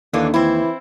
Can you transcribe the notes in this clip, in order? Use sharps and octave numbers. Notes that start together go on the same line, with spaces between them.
D#2 D3 E3 A#3 D4
E3 C4 E4